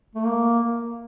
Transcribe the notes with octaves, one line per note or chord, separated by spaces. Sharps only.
A3
A#3